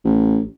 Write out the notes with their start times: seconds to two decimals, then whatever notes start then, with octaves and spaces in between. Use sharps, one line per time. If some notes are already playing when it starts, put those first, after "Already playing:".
0.04 A1